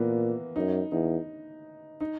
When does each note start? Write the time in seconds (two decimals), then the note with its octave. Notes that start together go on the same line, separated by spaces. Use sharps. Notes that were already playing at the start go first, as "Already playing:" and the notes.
Already playing: A#2 E3 A#3 B3
0.56 F#2 D#4
0.92 E2 D#4
2.01 D#4